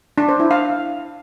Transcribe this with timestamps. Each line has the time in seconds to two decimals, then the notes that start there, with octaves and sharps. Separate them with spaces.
0.18 D4
0.29 C5
0.40 E4
0.51 F5